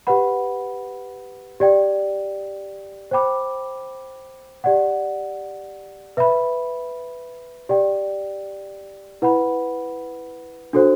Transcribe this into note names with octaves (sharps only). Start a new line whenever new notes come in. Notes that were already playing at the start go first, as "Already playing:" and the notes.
G4 B4 F#5 B5
G4 D5 G5
C5 G5 B5 D6
G4 D5 F#5
B4 E5 B5
G4 D5 G5
E4 B4 F#5 B5
D4 F#4 A4 C5